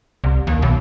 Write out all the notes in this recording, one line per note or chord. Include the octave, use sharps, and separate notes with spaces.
C2
D#2
B1